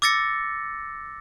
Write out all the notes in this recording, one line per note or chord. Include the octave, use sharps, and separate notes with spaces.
D6 E6 A6 A#6 C#7